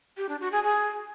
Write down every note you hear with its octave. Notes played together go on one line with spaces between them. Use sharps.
G4
D4
F#4
G#4
G#4